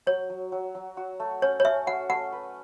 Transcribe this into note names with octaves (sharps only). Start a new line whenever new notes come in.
F#3 C#5
F#3
F#3
F#3
F#4
A3
C#4 C#5
C#5
C#4 E5
F#4 F#5
A3 F#5
B4